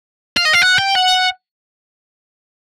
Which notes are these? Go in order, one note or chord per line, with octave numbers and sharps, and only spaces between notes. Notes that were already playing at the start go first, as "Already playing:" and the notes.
F5
D#5
F5
F#5
G5
F#5